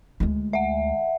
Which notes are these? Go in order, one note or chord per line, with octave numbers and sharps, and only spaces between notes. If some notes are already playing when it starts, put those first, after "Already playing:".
D2 G#3
E5 F#5